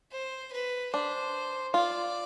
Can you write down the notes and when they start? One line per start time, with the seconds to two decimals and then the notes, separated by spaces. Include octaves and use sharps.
0.12 C5
0.52 B4
0.93 D4 C5
1.74 F4 D5